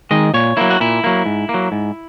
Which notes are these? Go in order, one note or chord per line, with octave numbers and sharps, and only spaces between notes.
D#3 G#3 D#5
A#2 C#5
F#3 A#3 E4
F#4
A#2 E4
F#3 A#3
G#2
A#3
F#3
G#2